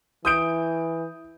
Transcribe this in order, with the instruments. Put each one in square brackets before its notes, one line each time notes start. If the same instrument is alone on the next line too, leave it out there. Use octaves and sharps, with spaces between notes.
[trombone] E3 [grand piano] D#6 G6 D7